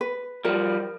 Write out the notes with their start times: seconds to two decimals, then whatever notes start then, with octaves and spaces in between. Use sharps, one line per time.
0.01 B4
0.45 F3 G3 A#4